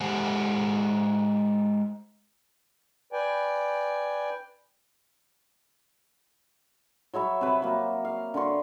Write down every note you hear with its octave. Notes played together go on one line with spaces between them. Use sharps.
G#3 G4 A4 C5 F#5 G#5
B4 D5 G5 G#5
F#3 C#5 E5 B5
C3 B4
F#3 A#3
F5
D3 B4 C6 C#6